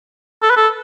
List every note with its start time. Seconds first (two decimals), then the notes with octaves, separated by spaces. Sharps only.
0.43 A4
0.50 B4
0.57 A4